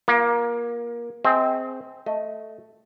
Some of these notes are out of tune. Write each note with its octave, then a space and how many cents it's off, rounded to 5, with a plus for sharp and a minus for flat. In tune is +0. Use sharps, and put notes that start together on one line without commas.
A#3 +20 F4 +0
C4 -5 G#4 +10 D#5 +40
A3 +0 D#5 +10